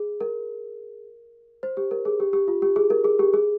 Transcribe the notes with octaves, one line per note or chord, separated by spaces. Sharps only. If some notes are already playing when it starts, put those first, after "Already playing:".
Already playing: G#4
A#4
C5
G4
A#4
G#4
G4
G4
F4
G4
G#4
A#4
G#4
G4
G#4